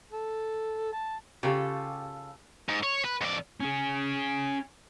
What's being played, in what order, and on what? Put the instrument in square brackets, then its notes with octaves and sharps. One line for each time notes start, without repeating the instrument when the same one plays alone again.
[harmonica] A4
A5
[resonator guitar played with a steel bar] C#3 F4 A4 [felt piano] G4
[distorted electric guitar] G#2
C#5
B4
F2 D5
C#4 G#4